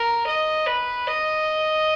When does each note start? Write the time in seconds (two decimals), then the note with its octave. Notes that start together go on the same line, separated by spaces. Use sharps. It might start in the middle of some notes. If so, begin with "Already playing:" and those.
Already playing: A#4
0.27 D#5
0.67 B4
1.08 D#5